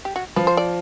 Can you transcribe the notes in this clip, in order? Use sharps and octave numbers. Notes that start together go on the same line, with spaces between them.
G4
F#4
F3 B4
C5
D5